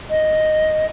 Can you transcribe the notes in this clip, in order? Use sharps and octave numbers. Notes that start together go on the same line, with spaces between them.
D#5